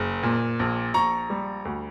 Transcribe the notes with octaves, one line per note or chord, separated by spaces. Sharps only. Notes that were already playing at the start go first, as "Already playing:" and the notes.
Already playing: F#1
A#2
A#1
A#1 A#5 C#6
G3
D2